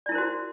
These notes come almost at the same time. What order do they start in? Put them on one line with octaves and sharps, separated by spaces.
D5 E4 A#4 C5 F#4